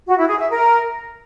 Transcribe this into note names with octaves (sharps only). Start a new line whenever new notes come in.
F#4
E4
G#4
E5
A#4